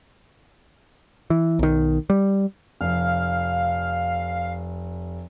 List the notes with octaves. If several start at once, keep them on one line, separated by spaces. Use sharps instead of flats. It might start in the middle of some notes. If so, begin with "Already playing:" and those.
E3
B1 D#3
G3
F1 F5